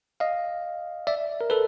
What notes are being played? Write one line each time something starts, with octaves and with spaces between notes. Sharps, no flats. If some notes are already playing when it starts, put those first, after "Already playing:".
D#5 F5
D5 E5
A#4
A4 B4